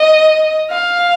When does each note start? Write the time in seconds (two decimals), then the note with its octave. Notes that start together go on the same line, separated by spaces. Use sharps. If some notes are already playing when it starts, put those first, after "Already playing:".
Already playing: D#5
0.71 F5